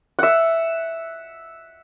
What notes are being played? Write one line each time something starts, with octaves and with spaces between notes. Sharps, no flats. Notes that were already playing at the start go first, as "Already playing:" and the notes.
E5 F#5